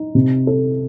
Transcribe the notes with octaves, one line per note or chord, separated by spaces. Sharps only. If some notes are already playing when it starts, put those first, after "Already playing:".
Already playing: D#4
C3
A4